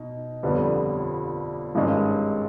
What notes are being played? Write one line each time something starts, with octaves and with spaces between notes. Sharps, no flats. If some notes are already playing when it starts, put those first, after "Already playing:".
Already playing: B2 D#4
G1 F2 D3 G3 B3
G#1 G2 D#3 G#3 C#4